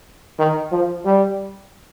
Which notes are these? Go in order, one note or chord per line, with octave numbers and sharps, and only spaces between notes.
D#3
F3
G3